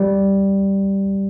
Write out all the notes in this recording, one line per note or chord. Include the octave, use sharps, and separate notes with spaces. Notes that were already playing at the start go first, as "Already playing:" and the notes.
Already playing: G3